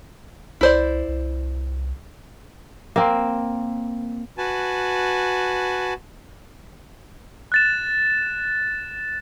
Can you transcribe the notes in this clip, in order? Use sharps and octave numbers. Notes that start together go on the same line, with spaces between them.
C2 E4 C5 D5
C2
A#3 C4
F#4 B4 G#5 A5
F#6 A6 E7